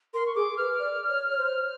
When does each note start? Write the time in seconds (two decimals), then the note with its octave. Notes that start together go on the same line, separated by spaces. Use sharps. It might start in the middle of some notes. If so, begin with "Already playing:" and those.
0.14 A#4 C6
0.26 C#6
0.35 G#4 D6
0.57 B4 F6
0.79 D5
1.09 C#5
1.31 C#5
1.38 C5